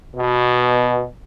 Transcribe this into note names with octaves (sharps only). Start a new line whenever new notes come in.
B2